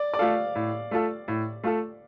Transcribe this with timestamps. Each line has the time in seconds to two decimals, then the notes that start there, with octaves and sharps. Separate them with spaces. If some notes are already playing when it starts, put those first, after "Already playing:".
Already playing: D5
0.14 D5
0.19 A3 F4 A4 F5
0.55 A2
0.91 A3 F4 A4
1.28 A2
1.64 A3 F4 A4